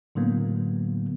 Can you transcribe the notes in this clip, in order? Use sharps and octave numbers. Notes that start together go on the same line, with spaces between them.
A2 D3 F#3 A#3 B3